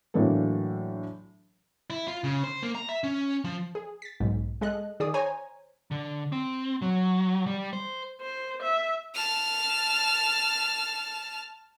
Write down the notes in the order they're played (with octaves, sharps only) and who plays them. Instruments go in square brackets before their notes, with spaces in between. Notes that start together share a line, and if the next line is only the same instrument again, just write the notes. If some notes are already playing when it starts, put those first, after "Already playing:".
[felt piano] A2 D3 E3 F#3 A#3 A4
[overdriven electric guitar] E4
F4
C#3
C5
A#3
A#5
E5
C#4
F3
[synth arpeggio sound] G#4
A6 B6
B1 G#2
G#3 A4 D#5 F#6
D#3 G#4 D5 D#6
C5 C#5 G#5 A#5
[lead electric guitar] D3
C4
F#3
G3
C5
[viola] C5
E5
[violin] A5 F6